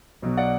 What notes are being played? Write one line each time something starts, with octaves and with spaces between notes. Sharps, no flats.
B1 B2 F#3
D5 F#5